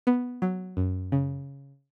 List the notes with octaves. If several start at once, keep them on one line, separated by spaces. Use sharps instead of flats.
B3
F#3
F#2
C#3